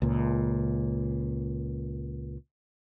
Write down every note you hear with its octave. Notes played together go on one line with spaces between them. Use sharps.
C#2 A#2